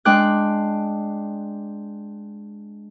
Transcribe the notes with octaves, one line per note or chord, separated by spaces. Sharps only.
G#3 D4 G5 D6 F#6